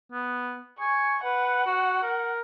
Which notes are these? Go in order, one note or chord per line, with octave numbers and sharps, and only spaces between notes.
B3
G#5 C#6
B4 F#5
F#4
A#4